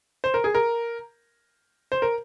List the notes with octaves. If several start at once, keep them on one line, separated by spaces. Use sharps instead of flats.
C5
A#4
G#4
A#4
C5
A#4